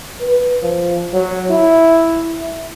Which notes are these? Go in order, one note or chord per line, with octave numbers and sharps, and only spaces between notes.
B4
F3
F#3
E4